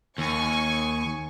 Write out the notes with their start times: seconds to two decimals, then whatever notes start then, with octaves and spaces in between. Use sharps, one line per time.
0.18 D#2 G#5 C#6